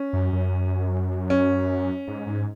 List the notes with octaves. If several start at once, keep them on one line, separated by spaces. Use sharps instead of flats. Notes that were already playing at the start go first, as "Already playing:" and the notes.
Already playing: C#4
F#2
F#2
C#4
G#2
G#2